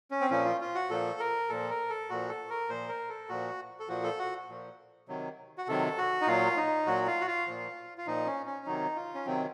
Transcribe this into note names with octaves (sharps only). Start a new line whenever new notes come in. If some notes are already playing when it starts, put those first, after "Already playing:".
C#4
C4
A#2 F3 C#4
F4
F4
F#4
A#2 F3 A4
A#4
A#2 F3 A4
A#4
A4
A#2 F3 F#4
A4
A#4
A#2 F3 C5
A#4
A4
A#2 F3 F#4
A4
A#2 F3 F#4
A4
F#4
A#2 F3
C3 D#3 F#3
F#4
C3 D#3 F#3 A4
F#4
D#4
A#2 F#3 F4
D#4
A#2 F#3 F#4
F4
F#4
F4
A#2 F3
F4
A#2 F3 D#4
C#4
C#4
C3 D#3 F#3 D#4
F4
C#4
C3 D#3 F#3 C4